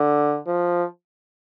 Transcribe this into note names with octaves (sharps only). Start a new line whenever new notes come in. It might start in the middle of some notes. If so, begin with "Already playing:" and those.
Already playing: D3
F3